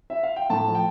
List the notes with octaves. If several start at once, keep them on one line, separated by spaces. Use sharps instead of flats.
E5
F5
G5
A2 A5
F3
G5